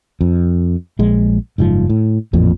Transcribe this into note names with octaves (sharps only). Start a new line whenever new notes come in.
F2
A#1 G#3
F#1 G#2 B2 F3
A2
A1 F2 A#2